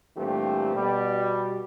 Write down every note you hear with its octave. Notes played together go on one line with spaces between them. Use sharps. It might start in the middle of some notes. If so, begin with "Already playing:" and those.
G2 A#2 E3 A3 C4 G4
B2 G3